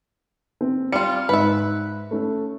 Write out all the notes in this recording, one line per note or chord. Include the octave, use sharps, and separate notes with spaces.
C4
G3 F4 C#7
G#2 B4 E5
A3 C#4 A4